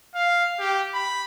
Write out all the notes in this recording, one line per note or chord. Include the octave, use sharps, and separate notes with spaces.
F5
G4
B5